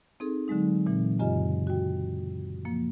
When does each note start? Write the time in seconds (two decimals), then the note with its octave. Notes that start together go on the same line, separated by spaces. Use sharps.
0.20 C4 D#4 G#4 A4
0.48 D3 F#3 G#3 D#4
0.86 A#2 E3 C4
1.19 F#2 C#3 F4 G4 D#5 G#5
1.67 F#4 G5
2.65 F3 A#3